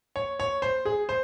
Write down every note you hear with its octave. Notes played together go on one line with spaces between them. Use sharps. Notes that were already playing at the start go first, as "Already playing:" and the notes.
C#5
C#5
C5
G#4
C5